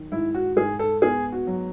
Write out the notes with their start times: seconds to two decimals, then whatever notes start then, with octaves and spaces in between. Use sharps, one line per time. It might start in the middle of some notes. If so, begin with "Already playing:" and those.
Already playing: D#3 F#3
0.12 G#2 E4
0.34 F#4
0.56 G#2 G#4
0.79 A4
1.02 B3 G#4
1.32 F#4
1.47 F#3